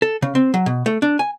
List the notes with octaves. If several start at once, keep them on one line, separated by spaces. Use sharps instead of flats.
A4
C#3
C4
F#3
B2
A3
D4
G#5